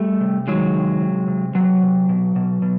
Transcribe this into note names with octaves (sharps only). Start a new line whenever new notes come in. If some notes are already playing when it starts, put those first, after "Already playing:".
Already playing: G3 A3
C3
D#3 F#3 G#3
C3
C3
C3
C3 F#3
C3
B2
B2
B2